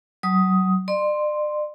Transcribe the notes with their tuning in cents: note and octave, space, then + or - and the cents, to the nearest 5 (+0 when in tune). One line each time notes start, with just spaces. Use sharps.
F#3 +25 D#6 +10
D5 +40 C6 +0